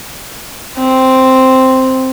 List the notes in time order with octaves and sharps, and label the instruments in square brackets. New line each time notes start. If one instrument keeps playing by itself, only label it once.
[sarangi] C4